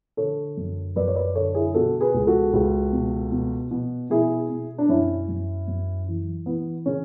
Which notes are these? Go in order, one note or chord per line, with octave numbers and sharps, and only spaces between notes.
D3 A4 C#5
F#2
F#2 B4 D5
C#5
B4 D5
D3 A4 C#5
E4 G#4
B2 F#4 A4
G#4 B4
C#2
F#4 A4
C#2
B2
B2
B2
B2 E4 G#4
B2
D4
F#2 C#4 E4
F#2
F#2
E3
E3 B3
C#3 C#4